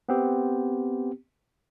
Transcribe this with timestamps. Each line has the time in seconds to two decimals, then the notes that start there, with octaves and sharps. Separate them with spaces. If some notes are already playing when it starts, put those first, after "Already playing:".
0.09 B3 C4 G4